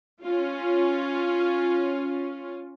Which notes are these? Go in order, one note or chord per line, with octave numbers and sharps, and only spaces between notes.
C#4 F4